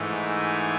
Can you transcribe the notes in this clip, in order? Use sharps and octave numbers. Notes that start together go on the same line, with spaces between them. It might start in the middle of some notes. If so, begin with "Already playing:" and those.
Already playing: G#2 E3 A3 D#4
G#5